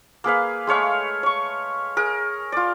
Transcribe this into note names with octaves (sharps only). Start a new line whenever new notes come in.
A#3 G#4 B4 F5
G#3 A3 C#5 F5
C#5 C#6
G#4 A#4
F4 D5